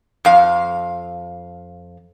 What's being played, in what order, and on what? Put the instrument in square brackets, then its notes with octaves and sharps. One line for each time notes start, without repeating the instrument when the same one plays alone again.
[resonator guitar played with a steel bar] F2 F5